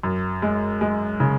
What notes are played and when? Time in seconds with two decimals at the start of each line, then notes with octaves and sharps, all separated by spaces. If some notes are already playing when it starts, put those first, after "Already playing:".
0.03 F#2
0.42 G#3
0.81 G#3
1.20 C#3